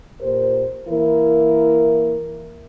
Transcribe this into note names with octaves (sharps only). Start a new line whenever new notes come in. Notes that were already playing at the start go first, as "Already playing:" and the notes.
A#2 G4 A#4 C5
E3 A#3 E4 A#4